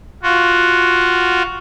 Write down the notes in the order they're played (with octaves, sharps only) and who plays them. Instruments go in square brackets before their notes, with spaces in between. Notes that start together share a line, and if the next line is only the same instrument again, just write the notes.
[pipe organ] F4 F#4